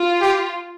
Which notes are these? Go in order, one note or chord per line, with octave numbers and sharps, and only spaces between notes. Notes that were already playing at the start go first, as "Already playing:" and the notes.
Already playing: F4
G4